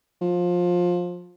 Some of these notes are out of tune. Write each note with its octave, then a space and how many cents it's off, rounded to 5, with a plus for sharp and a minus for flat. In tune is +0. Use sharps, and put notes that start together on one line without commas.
F3 +20